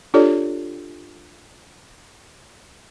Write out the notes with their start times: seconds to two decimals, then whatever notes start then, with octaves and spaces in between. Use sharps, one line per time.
0.14 D4 F4 G4 A4 C#5 D5